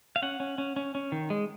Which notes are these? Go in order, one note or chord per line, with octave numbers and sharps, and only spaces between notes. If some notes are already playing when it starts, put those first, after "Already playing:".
F5
C#4 F#5
C#4
C#4
C#4
C#4
D#3
G#3